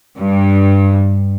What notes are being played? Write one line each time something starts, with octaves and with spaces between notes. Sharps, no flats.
G2